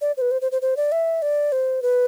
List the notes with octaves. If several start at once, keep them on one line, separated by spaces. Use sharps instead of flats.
D5
C5
B4
C5
C5
C5
C5
D5
E5
D5
C5
B4